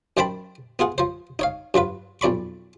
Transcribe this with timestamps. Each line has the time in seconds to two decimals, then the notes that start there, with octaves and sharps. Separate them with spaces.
0.17 F#2 D#3 C5 G5 A5 B5
0.79 B3 F4 G#4 F#5
0.98 F3 C5
1.39 D#4 C#5 F5
1.74 G2 F#3 F4 B4
2.21 B1 F2 D5 B5 C#6